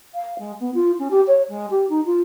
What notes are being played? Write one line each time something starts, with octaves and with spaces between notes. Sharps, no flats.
F5
G#3
B3
F4
C#4
G4
C#5
G#3
G4
D#4
F4